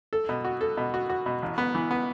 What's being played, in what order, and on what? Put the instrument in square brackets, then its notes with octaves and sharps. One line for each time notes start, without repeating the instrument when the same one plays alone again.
[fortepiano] A4
B2
F#4
A4
B2
F#4
F#4
B2
A1
B3
E3
B3